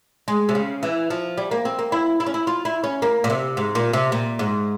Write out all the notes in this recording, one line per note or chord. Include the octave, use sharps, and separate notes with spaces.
G#3
C3
C#3
E3
F3
G3
A#3
C4
A#3
E4
E4
C#4
E4
F4
E4
C#4
A#3
A#2
C3
G#2
A#2
C3
A#2
G#2